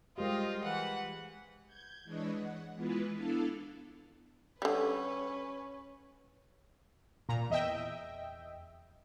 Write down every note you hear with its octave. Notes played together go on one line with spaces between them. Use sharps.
G3 G#3 F4 G4 A#4 C5 D#5
E3 B4 F#5
G6 G#6
E3 G#3 D4 B4 C#5 D#5
F#5
E3 G#3 B3 E4 F4 B4
B3 D4 E4 A4 F5 A5
D3 G3 C#4 B4
A#2 A#5
E2 D#5 E5 G5